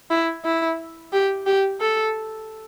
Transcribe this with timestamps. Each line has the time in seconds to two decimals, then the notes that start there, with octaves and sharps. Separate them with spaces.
0.10 E4
0.44 E4
1.13 G4
1.46 G4
1.80 A4